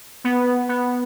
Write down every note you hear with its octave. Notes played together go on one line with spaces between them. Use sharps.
B3
B3